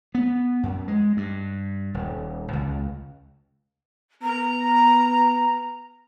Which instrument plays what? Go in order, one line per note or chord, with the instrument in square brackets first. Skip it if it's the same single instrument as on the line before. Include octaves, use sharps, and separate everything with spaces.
[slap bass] B3
F#2
G#3
G2
D#1
C#2
[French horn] B3 [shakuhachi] A#5